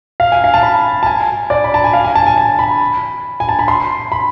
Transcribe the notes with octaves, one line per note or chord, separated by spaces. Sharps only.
F5
G#5
F5
A5
B5
A5
G#5
D5
B5
A5
G#5
F5
G#5
A5
G#5
A5
B5
G#5
A5
B5
C6
B5